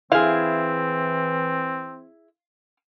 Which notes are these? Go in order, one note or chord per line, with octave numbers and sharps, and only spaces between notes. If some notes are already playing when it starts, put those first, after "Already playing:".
E3 C4 E4 G#4 F5